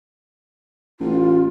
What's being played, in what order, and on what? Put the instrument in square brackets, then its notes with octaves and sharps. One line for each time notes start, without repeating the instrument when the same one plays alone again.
[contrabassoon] A1 [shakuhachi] F4